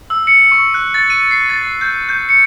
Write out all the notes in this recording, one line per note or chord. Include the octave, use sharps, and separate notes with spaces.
E6
C#7
C#6
F#6
A6
D#7
C7
A6
G6
G6
C#7